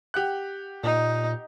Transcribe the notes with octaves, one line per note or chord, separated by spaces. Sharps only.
G4 F#5 F#6
A#2 D#4